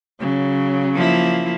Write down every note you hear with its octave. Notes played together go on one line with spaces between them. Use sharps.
C#3 F#3
F3 A#3 E4